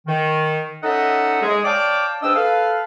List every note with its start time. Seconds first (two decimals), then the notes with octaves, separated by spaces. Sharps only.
0.07 D#3
0.83 C#4 D#4 A4 D#5 E5 F#5
1.42 G#3 G#4
1.64 C#5 D5 F5 G5 A5 D6
2.22 G#2 D4 B4 D#5 G5 E6
2.36 A4 B4 F5